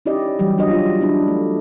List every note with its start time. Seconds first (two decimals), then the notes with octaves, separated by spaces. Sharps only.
0.06 C#4 D#4 E4 G4 D5 D#5
0.39 E3 F#3 G3 G4
0.58 D4 F#4 D#5
0.71 F4
1.01 D4 E4
1.28 A3